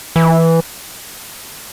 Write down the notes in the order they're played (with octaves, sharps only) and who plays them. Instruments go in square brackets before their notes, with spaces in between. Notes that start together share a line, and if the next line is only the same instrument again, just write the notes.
[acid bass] E3